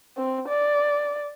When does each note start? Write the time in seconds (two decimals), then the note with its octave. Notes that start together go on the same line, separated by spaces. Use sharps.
0.17 C4
0.48 D5